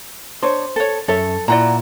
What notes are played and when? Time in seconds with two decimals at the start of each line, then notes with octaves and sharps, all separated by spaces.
0.43 D4 C5 C#5
0.76 A4 C#5
1.08 F#2 A4 C#5 E5
1.48 A#2 E4 D5 F#5 A#5